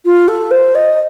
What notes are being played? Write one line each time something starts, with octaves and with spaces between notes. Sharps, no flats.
F4
A4
C5
D#5